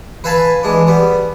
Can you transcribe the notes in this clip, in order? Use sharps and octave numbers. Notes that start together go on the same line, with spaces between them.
B4 E5 F5 G#5 A5 B5
E3 G#3 D4
G3 B3